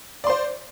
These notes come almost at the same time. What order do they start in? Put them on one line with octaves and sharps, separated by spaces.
D5 C6 C5